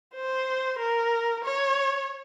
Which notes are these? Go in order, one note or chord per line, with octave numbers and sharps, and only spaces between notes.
C5
A#4
C#5